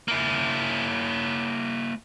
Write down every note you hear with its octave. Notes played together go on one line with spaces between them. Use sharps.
A#3 E4